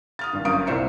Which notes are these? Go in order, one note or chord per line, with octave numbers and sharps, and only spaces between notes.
D#6 F6 A6
G#1 G2
G1 F#2 F5 D#6 D7
C2 A#2 D4 C5 E5 C#7